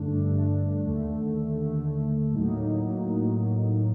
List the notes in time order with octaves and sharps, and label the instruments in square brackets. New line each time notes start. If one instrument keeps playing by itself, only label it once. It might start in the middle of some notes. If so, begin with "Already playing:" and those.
Already playing: [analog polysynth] G2 D3 A3 D4
G2 D3 A3 D4
D#2 D3 A3
D#2 D3 A3
A2 F#3 A#3 D#4
A2 F#3 A#3 D#4